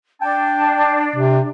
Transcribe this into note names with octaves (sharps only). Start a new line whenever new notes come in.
D4 G5 A5
C3